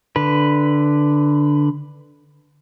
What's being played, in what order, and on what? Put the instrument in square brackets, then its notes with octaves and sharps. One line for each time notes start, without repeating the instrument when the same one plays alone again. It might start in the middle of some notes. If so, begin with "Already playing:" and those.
[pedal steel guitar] D3 B4